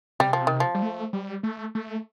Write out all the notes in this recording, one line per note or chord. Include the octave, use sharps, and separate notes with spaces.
C3 G3
F3
D#3
F3
G3
A3
G3
A3
A3